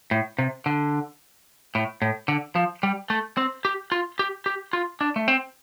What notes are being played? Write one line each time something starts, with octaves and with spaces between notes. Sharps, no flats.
A2
C3
D3
A2
A2
D3
F3
G3
A3
C4
G4
F4
G4
G4
F4
D4
A3
C4